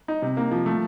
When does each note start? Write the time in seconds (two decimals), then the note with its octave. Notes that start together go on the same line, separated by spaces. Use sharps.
0.08 D#4
0.22 C3
0.37 A#3
0.52 F3
0.66 A3